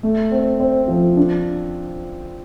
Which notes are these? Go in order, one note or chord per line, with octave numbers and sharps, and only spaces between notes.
A3
C4
C4
F3
D4